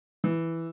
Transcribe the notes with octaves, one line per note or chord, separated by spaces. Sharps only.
E3